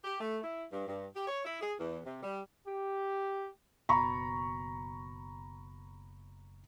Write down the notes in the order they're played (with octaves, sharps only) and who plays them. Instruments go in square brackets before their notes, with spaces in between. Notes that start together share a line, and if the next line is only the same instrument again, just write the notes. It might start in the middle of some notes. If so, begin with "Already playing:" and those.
[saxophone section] G4
A3
E4
G2
G2
G4
C#5
E4
G#4
E2
C3
G3
[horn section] G4
[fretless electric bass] F#1 B2 [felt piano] A#5 B5 C#6